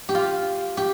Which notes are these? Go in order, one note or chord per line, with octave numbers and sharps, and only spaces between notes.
G4
F4
G4